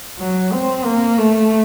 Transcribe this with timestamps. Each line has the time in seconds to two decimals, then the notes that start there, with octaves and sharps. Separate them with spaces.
0.19 F#3
0.53 C4
0.85 A#3
1.18 A3